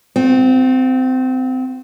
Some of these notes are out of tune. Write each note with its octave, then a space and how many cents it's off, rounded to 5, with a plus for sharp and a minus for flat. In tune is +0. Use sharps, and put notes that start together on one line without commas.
C4 -25 F4 +35